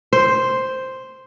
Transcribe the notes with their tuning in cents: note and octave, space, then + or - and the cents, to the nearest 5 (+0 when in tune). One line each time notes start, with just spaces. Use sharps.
C5 +0